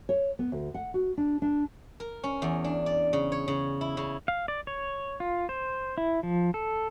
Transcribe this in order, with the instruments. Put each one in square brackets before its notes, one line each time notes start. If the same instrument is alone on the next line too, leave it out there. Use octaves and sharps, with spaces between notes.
[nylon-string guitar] C#5
B3
D2
F#5
F#4
D4
D4
[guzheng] A#4
C#4
E2
D4
D5
C#3
C#5
C#3
E4
C#3
[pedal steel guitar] F5
D5
C#5
F4
C5
E4
F3
A4